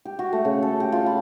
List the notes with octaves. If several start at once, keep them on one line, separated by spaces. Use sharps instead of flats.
G4
F#4
A3
C#3
A4
G4
F4
B5